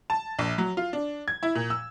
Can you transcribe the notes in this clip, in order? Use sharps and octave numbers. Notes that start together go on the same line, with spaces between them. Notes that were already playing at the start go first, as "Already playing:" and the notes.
A5
A#1
F#3
F4
D4
G#6
E4
A#2
E6